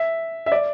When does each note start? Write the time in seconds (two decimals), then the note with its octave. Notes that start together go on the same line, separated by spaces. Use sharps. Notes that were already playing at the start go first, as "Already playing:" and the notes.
Already playing: E5
0.46 E5
0.52 D5